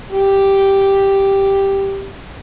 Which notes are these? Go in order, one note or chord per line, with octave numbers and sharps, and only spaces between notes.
G4